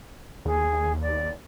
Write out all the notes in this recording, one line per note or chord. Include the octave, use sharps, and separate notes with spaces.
D#2 G#4
D5